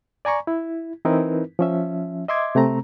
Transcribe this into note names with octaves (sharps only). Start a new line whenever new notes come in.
D5 G#5 A#5 C#6
E4
E3 C4 D#4 E4 A#4 B4
F3 C#4 E5
D#5 E5 C6 D6 G#6
C3 A3 C4 A#5